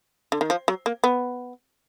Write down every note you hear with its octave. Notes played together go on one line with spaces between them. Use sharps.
D3
D#3
F3
F#3
A#3
B3